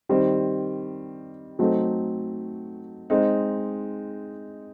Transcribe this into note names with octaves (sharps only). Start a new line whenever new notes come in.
D#3 G3 C4
F#3 A3 C4 D#4
G#3 C4 D#4